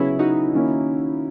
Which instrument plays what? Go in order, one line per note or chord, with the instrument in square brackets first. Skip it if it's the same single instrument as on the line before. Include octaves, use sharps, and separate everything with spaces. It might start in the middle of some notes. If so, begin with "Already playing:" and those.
Already playing: [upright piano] C#3 F#3 B3 [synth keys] C#4 E4
[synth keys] D#4 F#4
[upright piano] D#3 A#3 C#4 E4